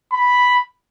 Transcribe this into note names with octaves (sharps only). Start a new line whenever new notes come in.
B5